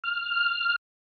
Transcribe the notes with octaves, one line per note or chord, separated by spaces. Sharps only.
F6